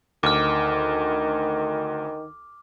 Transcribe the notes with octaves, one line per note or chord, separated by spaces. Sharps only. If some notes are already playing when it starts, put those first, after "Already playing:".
D2 D#3 D6 F6